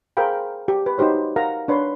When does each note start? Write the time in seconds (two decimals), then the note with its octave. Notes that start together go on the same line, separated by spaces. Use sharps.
0.17 G#4 A#4 C5 F5 G5 B5
0.68 G4
0.86 B4
0.98 D#4 F#4 G4 C5 C#5
1.36 A#4 F5 F#5 A#5
1.68 D4 B4 C#5 C6